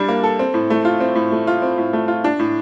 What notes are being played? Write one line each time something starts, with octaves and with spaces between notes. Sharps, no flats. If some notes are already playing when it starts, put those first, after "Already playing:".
Already playing: G3 D4
A#3
A4
C4
A2
A3
F4
C4
A2
A3
F4
C4
A2
A3
F4
D4
A2